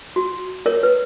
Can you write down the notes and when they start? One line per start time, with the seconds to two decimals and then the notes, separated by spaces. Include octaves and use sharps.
0.16 F#4
0.66 A#4 C#5
0.83 B4